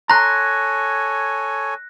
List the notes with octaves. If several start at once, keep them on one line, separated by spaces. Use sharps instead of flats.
A4 C#5 G#5 A#5 C6 F#6 A#6